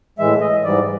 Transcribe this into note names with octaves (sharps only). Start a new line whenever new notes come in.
A2 E3 G#3 E5
D#5
G#2 E3 G3 D5